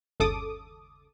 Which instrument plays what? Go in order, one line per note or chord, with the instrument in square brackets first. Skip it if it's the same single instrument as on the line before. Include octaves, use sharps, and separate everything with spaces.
[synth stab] G1 D#2 C#3 A4 D6 D#6